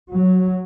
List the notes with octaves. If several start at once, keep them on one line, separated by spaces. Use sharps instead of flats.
F#3